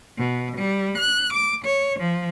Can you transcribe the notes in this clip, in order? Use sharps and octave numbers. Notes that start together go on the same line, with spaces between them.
B2
G3
F#6
D6
C#5
F3